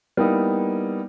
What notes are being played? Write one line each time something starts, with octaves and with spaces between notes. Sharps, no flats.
G3 A#3 B3 D#4 E4